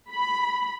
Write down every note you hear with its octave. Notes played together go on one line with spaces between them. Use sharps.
B5